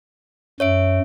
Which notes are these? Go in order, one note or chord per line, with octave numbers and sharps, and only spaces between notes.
F#2 C#5 E5 D7